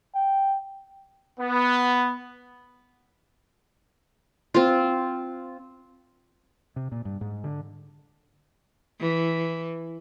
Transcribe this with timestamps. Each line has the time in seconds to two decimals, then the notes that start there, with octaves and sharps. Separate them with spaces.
0.15 G5
1.39 B3
4.54 C4 F4
6.76 C3
6.92 A#2
7.05 G2
7.21 G#2
7.44 D3
9.00 E3